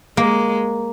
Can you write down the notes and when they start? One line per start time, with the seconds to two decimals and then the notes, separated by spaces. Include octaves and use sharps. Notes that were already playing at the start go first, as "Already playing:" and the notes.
0.17 G#3 A#3